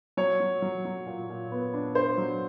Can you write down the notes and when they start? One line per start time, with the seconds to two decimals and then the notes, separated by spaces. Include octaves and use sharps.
0.17 F#3 C#5
0.40 F#3
0.62 F#3
0.85 F#3
1.06 A#2
1.30 A#2
1.51 B3
1.74 D4
1.95 D4 C5
2.18 F#3